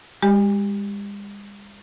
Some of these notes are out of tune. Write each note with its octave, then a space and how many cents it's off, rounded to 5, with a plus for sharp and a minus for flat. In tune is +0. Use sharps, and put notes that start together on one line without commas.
G#3 -45 G4 +0